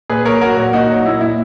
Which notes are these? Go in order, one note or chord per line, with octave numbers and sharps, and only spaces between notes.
A#2 G#4 B4
F#3 A#4 C#5
F#3 F#4 A#4
A#2
A#2 D#4 F#4
F#3
A#2 E4
A#2 E4